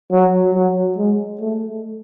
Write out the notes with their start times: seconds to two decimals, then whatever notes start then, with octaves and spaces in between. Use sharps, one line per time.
0.12 F#3
0.55 F#3
0.98 G#3
1.41 A3